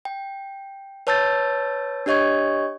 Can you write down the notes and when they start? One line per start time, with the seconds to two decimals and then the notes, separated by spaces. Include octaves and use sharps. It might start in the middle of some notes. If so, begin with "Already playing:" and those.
0.05 G5
1.07 B4 C#5 A5 E6 G6 A6
2.06 D4 G4 C#5 D#5 C#6 G#6